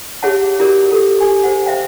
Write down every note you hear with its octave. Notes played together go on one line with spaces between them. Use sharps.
G4 G#4 C#5 E5 F#5 A5
E4 F#4 G4 A#4 D5
G4 A4
G4 G#5 C#6
G#4 C5 F#5
C5 E5 F5 G5